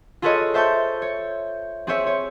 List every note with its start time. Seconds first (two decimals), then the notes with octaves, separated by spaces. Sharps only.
0.22 F4 G#4 A4 B4 C#5 D#5
0.54 C5 E5 A5 C#6 G6
1.02 C#5
1.87 C4 G#4 C5 C#5 E5
2.06 C#5